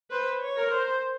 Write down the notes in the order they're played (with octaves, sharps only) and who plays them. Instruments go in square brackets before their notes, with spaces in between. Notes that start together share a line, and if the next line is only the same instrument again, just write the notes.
[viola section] B4 [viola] C5
[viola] C#5
[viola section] A#4
[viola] C5